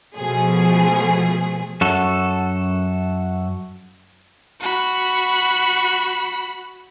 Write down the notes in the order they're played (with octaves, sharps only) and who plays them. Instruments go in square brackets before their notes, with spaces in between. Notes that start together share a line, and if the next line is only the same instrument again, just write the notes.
[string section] B2 F3 A3 G#4
[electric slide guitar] F#2 F#4 A4
[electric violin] F#4 B5